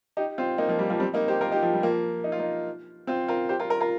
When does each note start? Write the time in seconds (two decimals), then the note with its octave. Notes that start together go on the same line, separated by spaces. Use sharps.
0.17 D#4 G4
0.38 C4 F4
0.58 A#3 D#4
0.68 F3 A#3
0.79 G3
0.90 F3 A#3
1.00 G3 C4
1.14 A#3 D#4
1.28 G4 C5
1.41 F4 A#4
1.51 D#4 G4
1.62 F3
1.73 G3
1.83 F3 A#3
2.24 D#4
2.32 F4
2.39 A#3 D#4
3.07 C4 F4
3.28 F4 A#4
3.49 G4 C5
3.60 F4 A#4
3.70 F4 A#4
3.81 F4 A#4